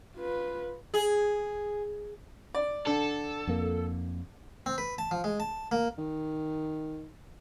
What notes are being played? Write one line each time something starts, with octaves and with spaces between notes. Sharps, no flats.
F4 B4
G#4
D5
D3 A4
F2 A#3
C4
B4
A5
F3
G#3
A5
A#3
D#3